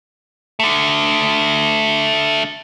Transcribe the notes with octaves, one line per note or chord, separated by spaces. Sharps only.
D3 A3